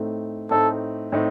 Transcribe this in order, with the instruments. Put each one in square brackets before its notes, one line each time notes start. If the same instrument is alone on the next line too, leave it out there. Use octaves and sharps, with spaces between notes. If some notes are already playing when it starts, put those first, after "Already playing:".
Already playing: [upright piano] A2 A3 C4 D#4
[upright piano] A2 A3 C4 D#4 [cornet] A4
[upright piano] A2 A3 C4 D#4